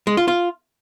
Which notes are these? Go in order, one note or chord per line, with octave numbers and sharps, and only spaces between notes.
G#3
F4
F4